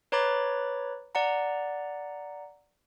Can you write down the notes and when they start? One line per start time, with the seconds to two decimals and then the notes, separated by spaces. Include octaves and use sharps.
0.12 B4 C#5 A#5 B5 D6 A6
1.15 D5 F#5 A#5